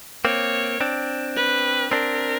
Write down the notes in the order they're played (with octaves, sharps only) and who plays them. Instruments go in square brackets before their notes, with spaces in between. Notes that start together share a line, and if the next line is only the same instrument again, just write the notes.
[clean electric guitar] A#3 C4 [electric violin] C#5
[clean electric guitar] C4 D4
[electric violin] B4
[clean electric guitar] C4 D4 [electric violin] A#4